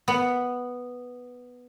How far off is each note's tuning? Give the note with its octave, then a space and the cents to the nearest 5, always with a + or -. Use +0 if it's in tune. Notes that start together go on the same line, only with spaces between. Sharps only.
B3 +0